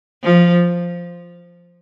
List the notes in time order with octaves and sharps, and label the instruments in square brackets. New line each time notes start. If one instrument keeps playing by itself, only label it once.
[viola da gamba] F3